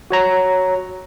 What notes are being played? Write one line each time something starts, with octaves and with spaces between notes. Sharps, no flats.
F#4 C#5 A#5